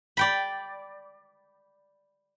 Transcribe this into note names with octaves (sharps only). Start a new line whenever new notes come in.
D5 G5 B5